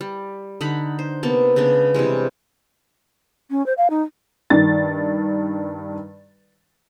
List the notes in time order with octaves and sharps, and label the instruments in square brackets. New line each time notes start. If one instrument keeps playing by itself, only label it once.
[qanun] G3
D3 D#4 F#5 B5
C5
C3 A#3 B3 A5
C#3 G#3 B3 D4
C3 E3 G3 G#3
[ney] C#4
C5
F5
D#4
[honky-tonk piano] G2 D#3 A6